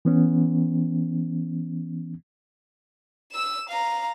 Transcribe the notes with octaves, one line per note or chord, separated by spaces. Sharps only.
E3 B3 C#4
E6 E7
F5 A#5